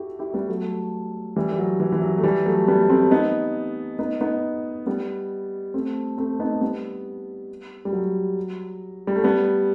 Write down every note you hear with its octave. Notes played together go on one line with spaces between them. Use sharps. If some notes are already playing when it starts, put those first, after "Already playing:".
Already playing: E4 F#4 G4 A4
E4 G4
G3 B3
F#3 A3
E3 G3
G3
F#3
E3
E3
F#3
A3
E3 G3
F#3 A3
G3 B3
A3 C4
B3 D#4
B3 D#4
B3 D#4
G3 B3
A3 C4
A3 C4
B3 D#4
G3 B3
G3
F#3
G3
A3
G3 B3